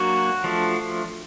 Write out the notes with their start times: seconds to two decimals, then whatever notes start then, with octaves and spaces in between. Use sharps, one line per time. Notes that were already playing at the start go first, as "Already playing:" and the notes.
Already playing: F#3 A#3 D4 F#4
0.44 F3 A3 D4